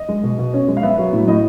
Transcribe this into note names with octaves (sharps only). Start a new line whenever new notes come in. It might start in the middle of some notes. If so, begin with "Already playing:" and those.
Already playing: D#5
G#3
B2
B2
C#4
G#3
F5
B3 E5
F#3
A2
A2 D#5